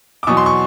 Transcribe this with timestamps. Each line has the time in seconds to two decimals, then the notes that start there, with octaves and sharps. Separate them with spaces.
0.23 D6
0.27 E2 B2 F#3 C#6 D#6
0.37 C6
0.46 C#6